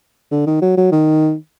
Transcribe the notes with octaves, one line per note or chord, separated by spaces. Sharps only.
D3
D#3
F#3
F#3
D#3